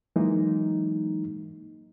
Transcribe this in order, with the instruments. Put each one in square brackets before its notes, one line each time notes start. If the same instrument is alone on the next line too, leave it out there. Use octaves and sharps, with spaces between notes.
[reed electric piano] E3 F#3 G#3 A#3 D#4